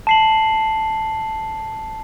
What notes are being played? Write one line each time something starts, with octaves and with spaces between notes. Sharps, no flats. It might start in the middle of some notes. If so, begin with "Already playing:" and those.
A5 C7 F#7